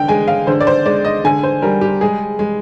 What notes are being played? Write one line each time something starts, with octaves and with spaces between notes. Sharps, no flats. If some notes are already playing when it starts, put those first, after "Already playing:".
Already playing: D3 G5
G#3 G#5
F5
D3 C5
D5
C5
G#3 D5
D#5
D3 G#5
C5
G3 A#4
G4
G#3 G#4
G#3